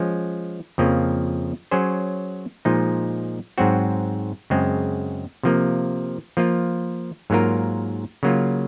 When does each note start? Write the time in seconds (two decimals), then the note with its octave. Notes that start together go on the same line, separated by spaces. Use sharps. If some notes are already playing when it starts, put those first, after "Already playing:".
Already playing: F3 G#3 C#4
0.78 F2 C#3 F3 A#3
1.71 F#3 C#4 G#4 C5
2.65 A#2 F3 G#3 D#4
3.58 G#2 F#3 C4 F#4
4.50 F#2 C#3 G#3 C4
5.43 C3 F3 A#3
6.37 F3 A#3 F4
7.30 G#2 F#3 A#3 F4 A#4
8.23 C#3 F#3 A#3 F4